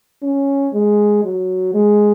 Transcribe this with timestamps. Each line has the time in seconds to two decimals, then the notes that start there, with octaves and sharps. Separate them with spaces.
0.23 C#4
0.74 G#3
1.24 F#3
1.74 G#3